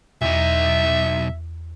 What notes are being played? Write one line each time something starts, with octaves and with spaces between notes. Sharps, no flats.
B1 E2 D#4 E5